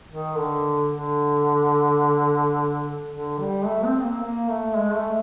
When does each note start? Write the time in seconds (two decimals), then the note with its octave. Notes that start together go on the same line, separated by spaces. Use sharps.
0.09 D#3
0.37 D3
0.92 D3
3.11 D3
3.39 G3
3.66 A3
3.85 C4
4.03 A#3
4.21 A#3
4.49 A3
4.76 G#3
4.95 A3